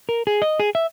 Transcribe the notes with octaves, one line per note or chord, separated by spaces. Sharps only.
A#4
G#4
D#5
G#4
E5